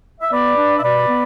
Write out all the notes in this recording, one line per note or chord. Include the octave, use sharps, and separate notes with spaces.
E5
B3 B4 D5
D4
E5
B2 B4 D5
B3